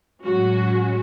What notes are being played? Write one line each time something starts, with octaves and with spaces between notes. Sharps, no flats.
A2 F#3 G#3 C#4 F#4